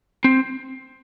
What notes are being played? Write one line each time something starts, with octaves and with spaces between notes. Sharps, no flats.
C4